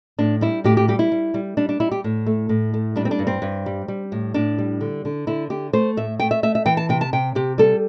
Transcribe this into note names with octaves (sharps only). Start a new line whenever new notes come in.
A2 D4
G3 E4
A2 G4
G4
G3 G4
E4
G3
G3
G3 D4
D4
G3 E4
G4
A2
A3
A2
A3
G3 D4
C4
D4
G2
C4
G2
G3
G3
A2
A2 D4
G3
D3
D3
D3 E4
D3 G4
A3 C5
A2 E5
A3 G5
E5
A3 E5
E5
E3 G5
A5
C3 G5
A5
C3 G5
C3 G4
G3 A4